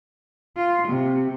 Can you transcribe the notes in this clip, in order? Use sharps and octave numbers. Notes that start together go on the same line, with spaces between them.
F4
C3